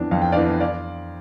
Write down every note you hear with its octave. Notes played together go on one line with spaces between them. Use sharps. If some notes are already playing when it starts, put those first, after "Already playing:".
Already playing: F2 E3 B3 D4
F2 F5
G5
E3 B3 D4 D5 F5
D5 F5